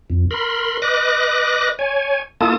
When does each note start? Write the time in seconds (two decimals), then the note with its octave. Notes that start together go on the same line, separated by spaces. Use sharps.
0.10 F2
0.31 A#4 B5 C6
0.82 B4 D#5 D6 F#6 A#6
1.79 C#5 G#5
2.41 A#3 E4 F4 A4 A5 D#6